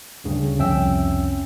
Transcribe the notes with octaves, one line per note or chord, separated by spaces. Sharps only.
D2 G2 C#3
C2 F2 C#4 E5 G5 E6